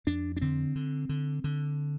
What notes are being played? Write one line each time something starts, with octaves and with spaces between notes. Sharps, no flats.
F2 D4
D4
D3 C4
D3
D3
D3